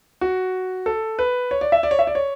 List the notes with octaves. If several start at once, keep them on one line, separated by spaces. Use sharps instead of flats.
F#4
A4
B4
C#5
D5
E5
D5
C#5
E5
D5
C#5